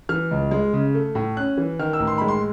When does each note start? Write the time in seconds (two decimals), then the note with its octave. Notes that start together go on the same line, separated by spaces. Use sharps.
0.09 E3 F6
0.31 C#2
0.51 G#3
0.73 C#3
0.94 A3
1.15 A2
1.37 C#4 F#6
1.57 E3
1.79 D#3 F6
1.93 E6
2.00 A1
2.07 C6
2.18 G#3 B5
2.28 C6